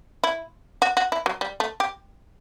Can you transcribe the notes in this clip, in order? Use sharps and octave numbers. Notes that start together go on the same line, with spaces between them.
E4
F#4
F#4
E4
F#3
G3
A3
G4